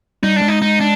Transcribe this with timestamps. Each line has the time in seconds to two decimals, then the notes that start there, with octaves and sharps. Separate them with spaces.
0.23 G3 D#4
0.36 D4
0.42 G#3
0.48 D#4
0.62 D#4
0.80 D4